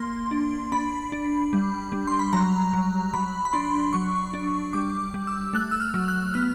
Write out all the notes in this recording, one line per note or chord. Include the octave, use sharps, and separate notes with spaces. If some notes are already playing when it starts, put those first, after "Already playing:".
Already playing: A#3 C6
D4
D4 B5
D4
G3
G3
C6
B5
F#3 A#5
F#3
F#3 B5
B5
D4 C6
F#3 C#6
D4
G3 D6
G3
E6
A3 F#6
E6
F6
F#3
F#6
B3 F6